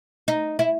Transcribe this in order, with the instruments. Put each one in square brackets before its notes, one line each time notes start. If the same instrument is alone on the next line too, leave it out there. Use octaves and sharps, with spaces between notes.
[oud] D#4
E4